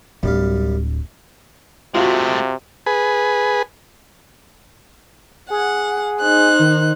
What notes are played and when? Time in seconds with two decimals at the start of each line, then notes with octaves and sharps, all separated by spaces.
0.23 D1 F#2 G3 F5
1.95 C3 G#3 A3 F4 F#4
2.86 G#4 B4
5.50 G#4 F#5
6.20 D#4 C5 F#6
6.59 D#3